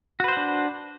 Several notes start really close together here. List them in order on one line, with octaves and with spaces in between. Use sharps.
F#4 B4 C5 F#5 D4